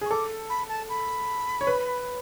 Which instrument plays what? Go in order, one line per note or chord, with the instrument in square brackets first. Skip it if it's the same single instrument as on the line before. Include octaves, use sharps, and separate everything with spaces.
[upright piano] G#4
[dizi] C#6
[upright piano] A4 [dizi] D6
[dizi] B5
A5
B5
[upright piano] C#5
B4